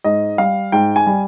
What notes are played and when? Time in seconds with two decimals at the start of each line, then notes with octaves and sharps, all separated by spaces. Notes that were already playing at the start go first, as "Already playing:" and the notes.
0.04 G#2 D#5
0.38 G3 F5
0.72 G#2 G5
0.96 G#5
1.07 G3